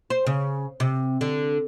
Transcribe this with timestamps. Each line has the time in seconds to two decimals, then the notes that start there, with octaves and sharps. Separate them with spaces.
0.10 C5
0.27 C#3
0.80 C3
1.21 D3